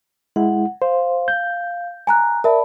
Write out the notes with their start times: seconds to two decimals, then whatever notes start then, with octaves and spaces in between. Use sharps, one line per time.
0.36 G#3 E4 F#5
0.82 C5 F5
1.28 G6
2.07 G#5 A#5 F#6
2.44 A#4 D5 E5 A5 B5